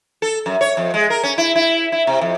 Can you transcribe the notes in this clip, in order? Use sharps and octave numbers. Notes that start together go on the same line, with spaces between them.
A4
F#2
C#5
F2
G#3
A#4
C#4
E4
E4
E4
C3
F2